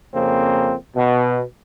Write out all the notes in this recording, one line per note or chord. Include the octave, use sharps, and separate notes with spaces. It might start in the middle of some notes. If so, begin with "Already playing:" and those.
F2 C#3 A#3 C4
B2